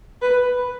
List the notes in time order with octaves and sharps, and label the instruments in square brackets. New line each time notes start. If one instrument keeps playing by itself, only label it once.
[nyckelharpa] B4